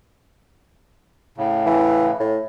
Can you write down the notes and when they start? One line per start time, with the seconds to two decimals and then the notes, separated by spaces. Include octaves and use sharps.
1.38 A2 C#3
1.66 E3
2.20 A2